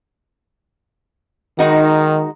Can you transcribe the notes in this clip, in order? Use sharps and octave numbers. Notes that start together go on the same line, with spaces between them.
D#3 G#3 D#4 F#4